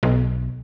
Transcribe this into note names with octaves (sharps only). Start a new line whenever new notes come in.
B1